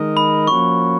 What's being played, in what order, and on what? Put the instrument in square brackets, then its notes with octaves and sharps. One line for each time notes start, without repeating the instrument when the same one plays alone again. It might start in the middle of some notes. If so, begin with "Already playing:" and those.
Already playing: [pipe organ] D#3 G#3 D#4 A#4 D#5
[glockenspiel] B5
[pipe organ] F3 A#3 C#4 F#4 [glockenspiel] C#6